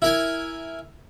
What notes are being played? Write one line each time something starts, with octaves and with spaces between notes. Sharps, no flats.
E4 A#4 G#5